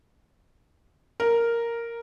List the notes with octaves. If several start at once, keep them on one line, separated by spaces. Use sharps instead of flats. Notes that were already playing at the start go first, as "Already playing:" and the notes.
A#4